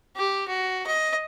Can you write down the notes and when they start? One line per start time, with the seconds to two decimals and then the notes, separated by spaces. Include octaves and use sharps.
0.16 G4
0.48 F#4
0.87 D#5